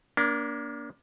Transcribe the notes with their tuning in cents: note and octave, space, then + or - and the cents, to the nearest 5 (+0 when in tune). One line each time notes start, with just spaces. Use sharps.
A#3 +25 D4 -25